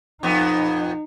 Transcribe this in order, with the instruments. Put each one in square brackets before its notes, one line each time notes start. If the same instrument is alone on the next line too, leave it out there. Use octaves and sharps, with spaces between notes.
[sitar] F2 B3 [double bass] D#4